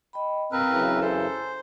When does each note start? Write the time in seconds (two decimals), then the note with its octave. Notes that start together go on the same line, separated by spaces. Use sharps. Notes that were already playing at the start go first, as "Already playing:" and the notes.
0.13 D#5 G5 B5
0.52 G2 C3 C4 A#4 B4 F5 A#5
0.66 F#2 C#3 E3
1.02 A4 C5 G#5 A#5